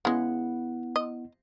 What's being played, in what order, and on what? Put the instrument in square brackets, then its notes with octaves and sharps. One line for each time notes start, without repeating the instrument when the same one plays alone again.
[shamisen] C#3 G#3 [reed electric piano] B3 E4 F#5
[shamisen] D#5